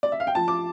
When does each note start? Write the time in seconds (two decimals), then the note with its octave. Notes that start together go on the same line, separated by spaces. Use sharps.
0.03 D5
0.12 E5
0.20 F5
0.27 G5
0.35 F3 A5
0.48 D6